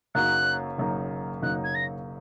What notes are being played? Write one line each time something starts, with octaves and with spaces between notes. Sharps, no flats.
F#1 F#2 F#3 A#3 D#4 F#6
F#1 F#2 F#3 A#3 D#4
F#1 F#2 F#3 A#3 D#4 F#6
G#6
A#6